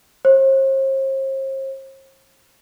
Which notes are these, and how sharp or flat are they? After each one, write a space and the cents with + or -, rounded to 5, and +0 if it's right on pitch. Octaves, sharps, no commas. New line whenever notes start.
C5 +45